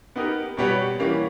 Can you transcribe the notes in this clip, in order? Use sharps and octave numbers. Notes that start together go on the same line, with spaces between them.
B3 D#4 G4 A#4
B2 G3 B3 G4 C#5
E3 G3 A#3 C#4 G4